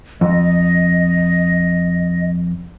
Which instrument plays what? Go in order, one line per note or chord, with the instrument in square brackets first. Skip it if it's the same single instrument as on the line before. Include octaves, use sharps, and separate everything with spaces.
[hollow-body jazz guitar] F2 [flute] D#5